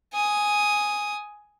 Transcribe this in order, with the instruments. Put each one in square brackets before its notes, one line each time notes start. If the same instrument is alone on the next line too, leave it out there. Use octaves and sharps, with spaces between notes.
[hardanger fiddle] G#5 D#6